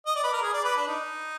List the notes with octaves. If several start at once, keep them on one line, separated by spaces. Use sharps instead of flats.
D#5
D5
B4
A#4
G#4
D5
B4
D4
D#4